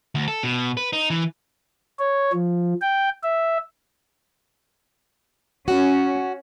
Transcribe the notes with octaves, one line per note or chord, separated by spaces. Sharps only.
D2
A4
B2
B4
D#4
E3
C#5
F3
G5
E5
C#4 F#4